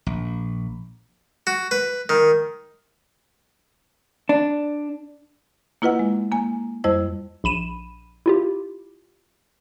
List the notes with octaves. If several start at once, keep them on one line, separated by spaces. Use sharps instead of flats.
A#1
F#4
B4
D#3
D4
A#3 E4 F4 B4 D#5 F#5
G#3
A#3 G#5
F2 G3 E4 C5 D#5 E6
A#1 B5 D#7 E7
E4 F4 G4